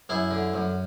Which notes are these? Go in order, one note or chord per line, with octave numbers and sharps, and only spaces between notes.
F#2 E4 G#4
D3
F#2